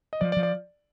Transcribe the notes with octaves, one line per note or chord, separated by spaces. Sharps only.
D#5
F3 D5
D5
F3
D5